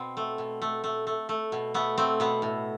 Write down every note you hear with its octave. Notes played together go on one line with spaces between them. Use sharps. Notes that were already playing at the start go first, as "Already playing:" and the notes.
Already playing: B2 C4
A3
B2
A3
A3
A3
A3
B2
A3 B3
A3 C4
B2 B3
A2